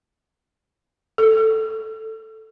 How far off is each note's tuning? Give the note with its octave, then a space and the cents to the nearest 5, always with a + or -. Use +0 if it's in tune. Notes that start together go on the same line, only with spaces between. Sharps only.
A4 +10